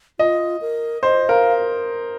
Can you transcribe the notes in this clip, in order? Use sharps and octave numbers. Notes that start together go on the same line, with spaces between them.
F4 D#5
A#4
C5 D#5
A#4 F5